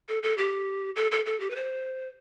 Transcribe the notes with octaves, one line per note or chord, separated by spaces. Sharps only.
A4
A4
G4
A4
A4
A4
G4
B4
C5